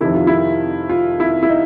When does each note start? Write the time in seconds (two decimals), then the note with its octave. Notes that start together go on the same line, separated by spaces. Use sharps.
0.01 F2 C3 D#3 E4
0.15 F4
0.27 E4
0.89 F4
1.20 E4
1.43 E4
1.49 D#4